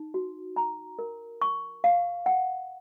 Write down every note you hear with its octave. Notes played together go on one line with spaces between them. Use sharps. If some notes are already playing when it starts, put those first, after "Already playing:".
Already playing: D#4
F#4
A#5
A#4
C#6
F5
F#5